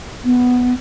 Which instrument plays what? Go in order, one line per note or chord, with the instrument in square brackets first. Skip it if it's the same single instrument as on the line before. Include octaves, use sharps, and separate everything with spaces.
[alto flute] B3